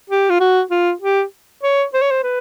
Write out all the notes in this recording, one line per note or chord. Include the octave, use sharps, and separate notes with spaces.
G4
F4
F#4
F4
G4
C#5
C5
C#5
C5
B4